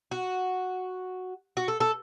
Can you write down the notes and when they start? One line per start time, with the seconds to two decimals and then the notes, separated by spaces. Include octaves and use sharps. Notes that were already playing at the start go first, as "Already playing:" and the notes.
0.11 F#4
1.57 F#4
1.68 A4
1.80 A4